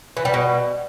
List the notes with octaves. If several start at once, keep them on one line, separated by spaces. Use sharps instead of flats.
E3
G3
B2